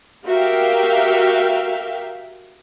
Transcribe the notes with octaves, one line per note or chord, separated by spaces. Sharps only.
F#4 G4 A#4 E5 F5 G5